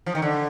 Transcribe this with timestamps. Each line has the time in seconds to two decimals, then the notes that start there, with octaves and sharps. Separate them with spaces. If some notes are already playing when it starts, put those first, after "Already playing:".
0.06 F3
0.15 D#3
0.22 D3